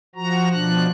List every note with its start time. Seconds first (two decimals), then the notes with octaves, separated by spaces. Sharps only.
0.16 F3 F#4 A#5
0.52 B2 F3 D4 F#6